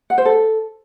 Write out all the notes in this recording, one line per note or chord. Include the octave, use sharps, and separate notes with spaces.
F#5
C5
A4